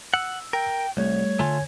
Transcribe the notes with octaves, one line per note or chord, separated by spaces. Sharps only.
F#5 E6
A#4 G5
C2 G3 A3 C#5
D3 A3 F4 G#5